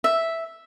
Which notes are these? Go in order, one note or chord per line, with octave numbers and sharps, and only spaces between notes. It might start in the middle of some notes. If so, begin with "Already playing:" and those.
E5